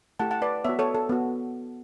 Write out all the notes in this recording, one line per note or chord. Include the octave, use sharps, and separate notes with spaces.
A3 E4 G4 F#5 A5
F#5 A5
B4 D5
B3 F#4 C#5 E5
A4 C#5
A4
B3 F#4